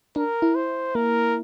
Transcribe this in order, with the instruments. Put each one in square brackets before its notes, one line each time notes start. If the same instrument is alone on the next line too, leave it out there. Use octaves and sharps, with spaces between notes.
[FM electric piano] D4 [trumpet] A#4
[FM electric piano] E4
[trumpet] C5
[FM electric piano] A#3 [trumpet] A#4